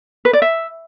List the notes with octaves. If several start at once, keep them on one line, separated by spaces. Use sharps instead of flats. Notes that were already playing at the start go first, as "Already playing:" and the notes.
B4
D5
E5